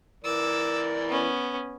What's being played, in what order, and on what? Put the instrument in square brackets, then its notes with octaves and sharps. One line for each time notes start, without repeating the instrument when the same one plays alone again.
[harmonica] E3 A#4 D5 [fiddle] D6 E6
[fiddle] B3 C#4